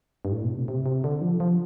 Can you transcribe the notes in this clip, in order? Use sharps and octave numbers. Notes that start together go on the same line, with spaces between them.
G2
A2
B2
C3
C3
C3
D3
F3
F3